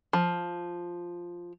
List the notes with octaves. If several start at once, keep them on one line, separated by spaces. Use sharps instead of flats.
F3